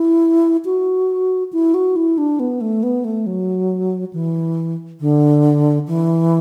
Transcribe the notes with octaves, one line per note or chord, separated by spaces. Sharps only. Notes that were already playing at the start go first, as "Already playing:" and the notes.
Already playing: E4
F#4
E4
F#4
E4
D4
B3
A3
B3
A3
F#3
E3
D3
E3